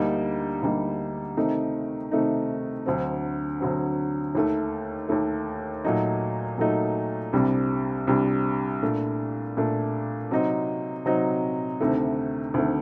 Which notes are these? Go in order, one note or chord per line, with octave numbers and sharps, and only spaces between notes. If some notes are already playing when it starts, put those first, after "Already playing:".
Already playing: D2 D3 G3 A#3 D#4
D2 D3 G3 A#3 D#4
C3 D#3 A3 D#4
C3 D#3 A3 D#4
D2 D3 F#3 C4
D2 D3 F#3 C4
D#2 D#3 A3
D#2 D#3 A3
A#2 F#3 A3 D#4
A#2 F#3 A3 D#4
C2 C3 G3 D4
C2 C3 G3 D4
A#2 A3 D4
A#2 A3 D4
C3 F#3 C4 D#4
C3 F#3 C4 D#4
D2 C3 D#3 A3
D2 C3 D#3 A3